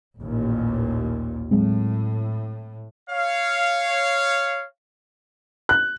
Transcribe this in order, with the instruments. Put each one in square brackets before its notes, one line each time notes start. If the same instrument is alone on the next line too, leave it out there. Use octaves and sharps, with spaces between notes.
[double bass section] A1 D#2 A#2
[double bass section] A2 [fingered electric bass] F#3 G#3 C4
[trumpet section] C#5 F5
[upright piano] F#6